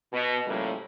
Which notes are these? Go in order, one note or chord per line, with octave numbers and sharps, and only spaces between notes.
B2
A2 C#3 F3 G3 A#3